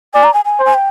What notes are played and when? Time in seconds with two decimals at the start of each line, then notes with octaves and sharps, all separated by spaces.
0.14 D5 G#5
0.24 A#5
0.34 G#5
0.45 G#5
0.60 C5
0.65 G#5
0.74 G5